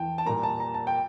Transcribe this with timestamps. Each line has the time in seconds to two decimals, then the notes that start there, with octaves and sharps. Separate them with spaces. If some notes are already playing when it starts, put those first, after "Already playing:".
Already playing: E2 E3 G5 A5
0.18 A5
0.25 A#2 G3 A#3 A#5
0.43 A5
0.60 A#5
0.74 A5
0.87 G5